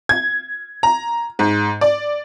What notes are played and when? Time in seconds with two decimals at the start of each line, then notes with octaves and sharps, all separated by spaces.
0.09 G#6
0.83 A#5
1.39 G#2
1.81 D5